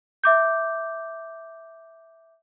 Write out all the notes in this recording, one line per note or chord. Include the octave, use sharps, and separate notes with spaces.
E5 D6 G6